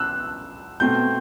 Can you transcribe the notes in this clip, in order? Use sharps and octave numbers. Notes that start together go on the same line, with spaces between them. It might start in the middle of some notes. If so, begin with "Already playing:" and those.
Already playing: B3 E6 F#6
B2 A3 C4 G6